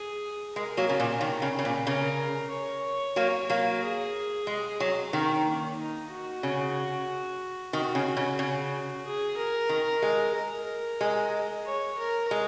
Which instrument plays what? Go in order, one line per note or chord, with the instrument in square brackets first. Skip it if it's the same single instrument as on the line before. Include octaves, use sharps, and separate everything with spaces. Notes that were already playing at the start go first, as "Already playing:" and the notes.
Already playing: [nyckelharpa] G#4
[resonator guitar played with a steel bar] G#3 [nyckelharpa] A#4
[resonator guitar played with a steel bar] F#3 A#3
C#3
A#2
D#3
C#3
C#3
A#2
[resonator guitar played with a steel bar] C#3 [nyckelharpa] A#4
[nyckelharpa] C#5
[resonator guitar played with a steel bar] F#3 A#3
F#3 A#3
[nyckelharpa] G#4
[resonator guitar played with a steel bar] G#3
F#3
[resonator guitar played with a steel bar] D#3 [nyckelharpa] C#4
[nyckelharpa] A#3
D#4
F#4
[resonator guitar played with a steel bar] C#3
[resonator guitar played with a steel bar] D#3 [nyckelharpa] F#4
[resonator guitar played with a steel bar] C#3
[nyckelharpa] F#4
[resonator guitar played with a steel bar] C#3
C#3
[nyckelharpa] G#4
A#4
[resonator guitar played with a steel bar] D#3
G#3
[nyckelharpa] A#4
[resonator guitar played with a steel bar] G#3
[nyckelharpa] C#5
A#4
[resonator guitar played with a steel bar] G#3